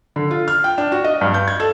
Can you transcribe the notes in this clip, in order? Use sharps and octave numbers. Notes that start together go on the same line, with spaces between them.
D3
F4
F6
G5
D4
F#4
D#5
G2
G6
G#6
A4